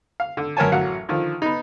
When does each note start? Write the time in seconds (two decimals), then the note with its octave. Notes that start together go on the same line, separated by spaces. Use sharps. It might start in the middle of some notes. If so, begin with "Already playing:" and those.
0.20 F5
0.37 D3
0.57 F#2 A#4 B4 C#5 G#5 A5
0.72 A1 F#3 F5 F#5
1.09 D3 D#3 F3
1.42 B3 D#4